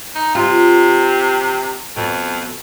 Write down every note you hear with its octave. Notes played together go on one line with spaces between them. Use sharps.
D#4
C3 F4
F2 B2